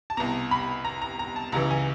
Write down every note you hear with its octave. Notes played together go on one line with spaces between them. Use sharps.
A5
C2 B2 A#5
B5
A#5
A#5
A#5
A5
C#2 C#3 E3 A#5
G#5